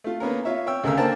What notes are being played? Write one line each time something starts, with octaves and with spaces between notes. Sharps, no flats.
A3 F4
A#3 B3 C#4 A#4
F4 C#5 E5
C#5 G5 E6
D2 C#3 A3 A#4 F5 E6
A#3 D4 A#4 C5 G5 A5